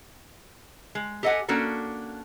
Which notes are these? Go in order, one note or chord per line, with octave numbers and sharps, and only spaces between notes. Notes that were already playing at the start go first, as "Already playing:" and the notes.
G#3
G4 A4 D#5 F5 F#5 G#5
A#3 C#4 D4 F#4 A4